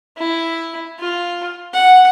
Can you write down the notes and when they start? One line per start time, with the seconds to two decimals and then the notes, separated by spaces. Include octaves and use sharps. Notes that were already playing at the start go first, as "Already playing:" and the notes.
0.17 E4
0.99 F4
1.73 F#5